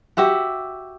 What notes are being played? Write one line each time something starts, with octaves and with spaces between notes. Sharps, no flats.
F#4 G4 E5 F#5